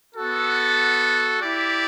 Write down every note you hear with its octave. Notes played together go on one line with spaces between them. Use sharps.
B3 F#4 A4
E4 G4 D5